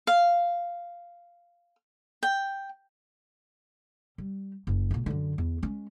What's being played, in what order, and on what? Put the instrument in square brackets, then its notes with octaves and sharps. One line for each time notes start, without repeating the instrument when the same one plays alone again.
[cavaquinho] F5
G5
[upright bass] G3
F#1
C#2 A#2
F#2 D3
E2
G#3 C#4